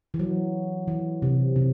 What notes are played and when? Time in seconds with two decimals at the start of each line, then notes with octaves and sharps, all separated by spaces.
0.14 E3
0.19 F#3
0.88 E3
1.22 C3
1.56 C3